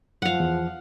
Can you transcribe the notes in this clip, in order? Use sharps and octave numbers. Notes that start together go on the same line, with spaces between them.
F#2 F3 F5 F#5
E2